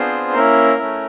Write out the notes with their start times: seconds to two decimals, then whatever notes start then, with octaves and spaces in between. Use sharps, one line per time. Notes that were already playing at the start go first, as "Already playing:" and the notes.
Already playing: B3 C4 D4 F4 G#4 C5
0.34 A#3 C#4 E4 A#4
0.78 A3 C#4 E4